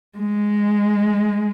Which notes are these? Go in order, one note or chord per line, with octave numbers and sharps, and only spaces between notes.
G#3